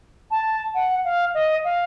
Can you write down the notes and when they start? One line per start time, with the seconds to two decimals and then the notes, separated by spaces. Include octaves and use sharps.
0.31 A5
0.74 F#5
1.04 F5
1.34 D#5
1.64 F5